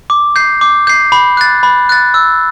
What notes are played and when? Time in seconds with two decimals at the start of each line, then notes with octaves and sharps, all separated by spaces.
0.10 D6
0.36 G6 C7
0.61 D6
0.87 G6 C7
1.12 B5
1.37 F#6 A6
1.63 B5
1.89 F#6 A6
2.14 E6